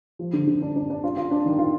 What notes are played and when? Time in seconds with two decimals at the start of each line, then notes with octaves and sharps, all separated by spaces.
0.19 F3
0.33 D3
0.47 D3
0.62 D4
0.76 D4
0.90 D4
1.04 F4
1.17 F4
1.31 D4
1.46 D#3
1.58 F4